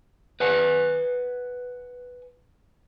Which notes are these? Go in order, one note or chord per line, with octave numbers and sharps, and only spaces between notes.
B4 F#5 G#5